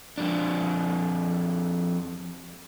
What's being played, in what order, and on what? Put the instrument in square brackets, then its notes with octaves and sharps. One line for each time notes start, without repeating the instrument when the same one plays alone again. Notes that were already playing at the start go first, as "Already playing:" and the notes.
[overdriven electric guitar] F2 D4